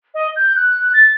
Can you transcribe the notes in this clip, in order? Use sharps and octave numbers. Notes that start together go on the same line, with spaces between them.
D#5
G6
F#6
A6